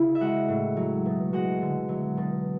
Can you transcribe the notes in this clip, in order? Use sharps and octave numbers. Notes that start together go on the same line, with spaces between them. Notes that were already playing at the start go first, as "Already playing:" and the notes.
Already playing: C#3 E4
E5
G#3 F#4 F#5
A2
F#3
B2
G#3 F#4 F#5
D3
F#3
B2